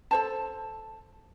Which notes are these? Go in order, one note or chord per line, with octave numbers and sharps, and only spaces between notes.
A4 C5 A5